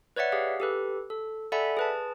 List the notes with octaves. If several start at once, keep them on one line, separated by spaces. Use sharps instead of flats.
B4 C#5 D5 E5 F#5
G4 G#4 F5
G4 A4 B4
A4
A4 D5 E5 F#5 G#5 B5
G#4 B4 A5